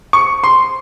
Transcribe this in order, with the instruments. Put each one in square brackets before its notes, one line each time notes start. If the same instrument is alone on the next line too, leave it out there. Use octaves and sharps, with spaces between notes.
[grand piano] C#6
C6